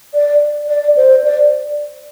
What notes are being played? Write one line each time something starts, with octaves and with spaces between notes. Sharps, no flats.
D5
D5
C5
D5